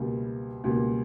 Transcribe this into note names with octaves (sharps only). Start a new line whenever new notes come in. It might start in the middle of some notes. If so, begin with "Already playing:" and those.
Already playing: C#2 B2 G3 A#3
C#2 B2 G3 A#3